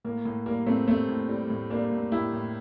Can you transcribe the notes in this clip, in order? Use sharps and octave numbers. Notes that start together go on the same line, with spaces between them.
A2 A#3
A2
G3 A#3
A2 A3 C4
G3 A3 C4
A2
G3
A2
G3 A#3 D4
A2
A2 E4 G4
A2